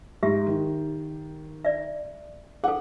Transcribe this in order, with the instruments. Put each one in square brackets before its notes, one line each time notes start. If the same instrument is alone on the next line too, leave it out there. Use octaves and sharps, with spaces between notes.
[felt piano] G#2 [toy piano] G4 E5
[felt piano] D#3
[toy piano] D5 E5
[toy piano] G#4 A4 [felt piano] F#5